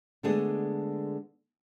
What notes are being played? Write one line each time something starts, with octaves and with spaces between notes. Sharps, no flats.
D3 G#3 A3 B3 D4 G#4